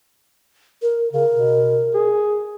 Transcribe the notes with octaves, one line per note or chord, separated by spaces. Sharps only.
A#4
C#3 A#4
B2
G#4